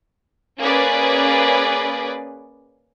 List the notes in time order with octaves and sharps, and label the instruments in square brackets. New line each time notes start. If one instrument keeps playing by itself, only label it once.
[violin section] A#3 C#4 G#4 B4 D5